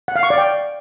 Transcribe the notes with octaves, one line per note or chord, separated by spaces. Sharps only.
F#5
F5
C#6
D5
G5